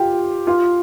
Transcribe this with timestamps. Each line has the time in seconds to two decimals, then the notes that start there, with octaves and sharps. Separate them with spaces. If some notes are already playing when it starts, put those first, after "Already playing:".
Already playing: F4 G4 G5
0.47 F4 F5